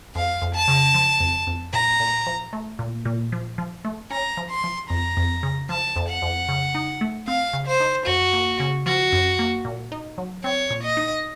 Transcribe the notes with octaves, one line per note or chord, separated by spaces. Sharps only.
F2 F5
F2
A5
C#3
F3
F2
F2
A#2 A#5
A#2
F3
A3
A#2
A#2
F3
F3
A3
C#4 A#5
F3
C6
F3
F2 A#5
F2
C#3
F3 A5
F2
F#5
F2
C#3
D#4
A3
C4 F5
C#3
C5
D#4
F#2 F#4
A#3
C#3
F3 F#4
F#2
A#3
A#2
D#4
F#3
C4 C#5
A#2
D#5
D#4